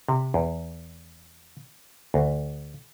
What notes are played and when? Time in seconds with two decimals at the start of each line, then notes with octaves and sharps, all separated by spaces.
0.09 C3
0.34 E2
2.14 D2